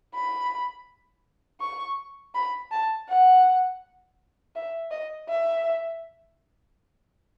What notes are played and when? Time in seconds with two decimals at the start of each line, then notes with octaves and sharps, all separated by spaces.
0.15 B5
1.61 C#6
2.35 B5
2.72 A5
3.09 F#5
4.56 E5
4.92 D#5
5.29 E5